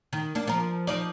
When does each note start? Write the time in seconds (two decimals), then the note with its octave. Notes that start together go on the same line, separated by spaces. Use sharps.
0.13 D#3
0.35 A#3 D4
0.48 F3 A#4
0.87 F3 D#4 D5